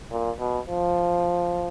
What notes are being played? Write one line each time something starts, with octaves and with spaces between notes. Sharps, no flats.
A#2
B2
F3